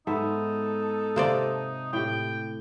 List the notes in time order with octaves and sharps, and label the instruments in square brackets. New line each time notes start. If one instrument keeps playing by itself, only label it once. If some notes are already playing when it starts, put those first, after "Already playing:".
[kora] G#2 B3 E5 [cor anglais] D#4 [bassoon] A4
[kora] C3 D#5 [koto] A#3 C5 D5
[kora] A2 G4 [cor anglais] G5